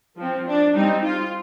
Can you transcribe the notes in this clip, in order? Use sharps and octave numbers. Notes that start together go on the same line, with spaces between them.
F3 C4
D4
G3 C4 D#4
F4